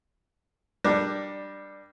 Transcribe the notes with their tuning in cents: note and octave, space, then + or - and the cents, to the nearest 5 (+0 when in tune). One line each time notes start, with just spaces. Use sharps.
G3 +0 D4 +15 A#4 +15